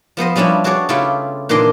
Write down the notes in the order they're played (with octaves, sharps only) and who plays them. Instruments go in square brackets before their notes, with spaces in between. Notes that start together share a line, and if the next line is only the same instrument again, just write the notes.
[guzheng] F3 B3 C5 D#5
F3 G3 C#4 D4 E4
D4 F#4 G#4 C#5 D5
C#3 A3 E4 F4 G4
A#2 D#3 E3 D4 A#4 C6